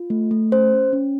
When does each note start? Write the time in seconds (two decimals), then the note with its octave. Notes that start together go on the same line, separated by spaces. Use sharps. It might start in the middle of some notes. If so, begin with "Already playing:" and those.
Already playing: F4
0.10 A3
0.31 A3
0.52 C#4 C5
0.73 C#4
0.93 C#4